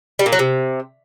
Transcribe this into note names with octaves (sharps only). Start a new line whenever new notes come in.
G3
A#2
F#3
C3